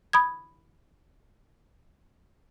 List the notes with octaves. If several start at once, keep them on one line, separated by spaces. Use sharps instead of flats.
B5 D#6 G#6